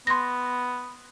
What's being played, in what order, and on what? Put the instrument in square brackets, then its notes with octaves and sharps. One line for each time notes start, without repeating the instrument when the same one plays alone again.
[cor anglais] B3 [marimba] C6 A#6